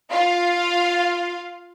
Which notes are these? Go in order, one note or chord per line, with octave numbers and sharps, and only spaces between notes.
F4 F5